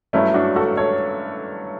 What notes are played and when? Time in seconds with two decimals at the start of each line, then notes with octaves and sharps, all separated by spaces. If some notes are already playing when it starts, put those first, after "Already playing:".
0.13 G2 F#3 A3 C#4 E4
0.34 D4 F#4
0.56 F#4 A4
0.77 A4 C#5